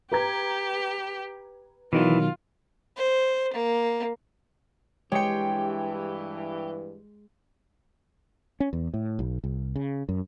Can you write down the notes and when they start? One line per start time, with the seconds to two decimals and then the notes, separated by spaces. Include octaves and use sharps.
0.12 G4 B4 A#5 G#6
1.93 B2 D#3 E3 F#3 F4
2.97 C5
3.53 A#3
5.12 G2 E3 G#3 G4 C#5 G5 C#7
8.60 C#4
8.73 E2
8.94 A2
9.19 B1
9.44 C2
9.76 C#3
10.09 F#2